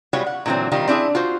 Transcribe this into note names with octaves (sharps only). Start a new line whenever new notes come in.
G3 G#3 B3 F4 F#4 C#5
F#5
A#2 D3 E3 F#3 C4
D#3 G3 C4 D#4 F4
C4 D4 E4 F#4 G#4
F4 F#4 C5